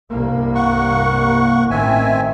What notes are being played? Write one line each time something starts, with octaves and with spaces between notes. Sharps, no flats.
C2 G2 A#3
F#5 C#6
A1 D#3 C4 E5 G#5